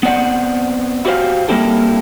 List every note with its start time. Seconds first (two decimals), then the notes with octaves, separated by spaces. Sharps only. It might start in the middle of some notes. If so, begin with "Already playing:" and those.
0.03 B3 C4 D5 F#5
1.05 E4 F#4 G4 B4 C5 F5
1.48 G3 A#3 C4 E4 G4 A4